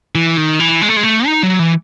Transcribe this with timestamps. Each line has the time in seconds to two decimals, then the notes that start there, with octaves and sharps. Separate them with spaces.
0.15 E3
0.37 D#3
0.60 E3
0.82 G#3
0.89 A3
0.97 G#3
1.03 A3
1.26 D#4
1.43 F#3
1.59 E3